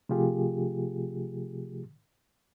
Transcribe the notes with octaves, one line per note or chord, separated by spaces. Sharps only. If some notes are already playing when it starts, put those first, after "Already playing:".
C3 F3 A3 F4 G4 G#4